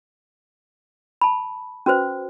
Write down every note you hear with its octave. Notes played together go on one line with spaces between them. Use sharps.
A5 B5
C#4 F#4 B4 C5